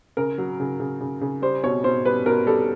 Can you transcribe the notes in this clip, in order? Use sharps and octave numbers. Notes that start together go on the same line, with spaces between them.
C#3 A#4
F#3
C#3
C#3
C#3
C#3
G3 C5
B2 C#5
B2 C5
G3 B4
B2 A#4
G3 A4